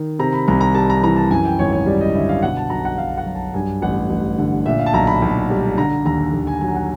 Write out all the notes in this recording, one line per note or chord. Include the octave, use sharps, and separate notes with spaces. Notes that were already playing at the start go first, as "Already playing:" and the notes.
Already playing: D#3
C3 A#5
B5
C2 A#5
A#5
G3 A5
A#5
E3 A#5
A5
F#2 G#5
G5
G#1 C#5
C#5
G3 D5
D#5
D3 E5
F5
B2 F#5
A5
B1 A#5
F#5
B1 F5
F#5
F#3
A5
G2 G#5
A1 F#5
A1
D3
A#2 E5
F5
A5
B1 A#5
B5
B1
G3
D3 A#5
D#2 A#5
D#2
G#5
F#3 G#5
F#5